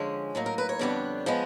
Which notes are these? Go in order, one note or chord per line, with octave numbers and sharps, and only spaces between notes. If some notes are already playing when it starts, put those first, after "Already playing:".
Already playing: D3 F3 G#3 C#4
A2 F#3 A#3 D#4
A#4
B4
C#5
F2 D3 G3 B3 D4
F3 G#3 B3